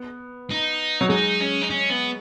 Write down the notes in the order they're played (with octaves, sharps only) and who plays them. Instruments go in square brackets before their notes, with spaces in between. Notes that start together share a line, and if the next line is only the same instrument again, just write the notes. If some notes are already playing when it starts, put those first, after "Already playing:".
Already playing: [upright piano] B3
[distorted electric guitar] D#4
[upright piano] F#3
[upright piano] G#3 [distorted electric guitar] D#4
[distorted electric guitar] C#4
D#4
C#4
B3